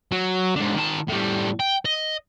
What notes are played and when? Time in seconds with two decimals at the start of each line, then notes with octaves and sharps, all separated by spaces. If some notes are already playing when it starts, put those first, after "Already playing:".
0.12 F#3
0.56 G#2 D3
0.75 D#3 A5
1.09 A2 G3
1.60 G5
1.85 D#5